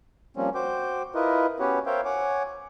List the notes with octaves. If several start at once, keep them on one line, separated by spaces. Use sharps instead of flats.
F3 G3 A#3 C4 C#4
F#4 C5 G5 D6
E4 F4 A#4 B4 D#5
B3 C#4 F#4 G4 B4 C#5
A#4 C5 C#5 E5 F5 G5
C#5 F#5 G#5 D6